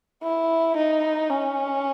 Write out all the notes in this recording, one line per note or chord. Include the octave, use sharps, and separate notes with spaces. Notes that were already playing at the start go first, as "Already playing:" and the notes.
E4
D#4
C#4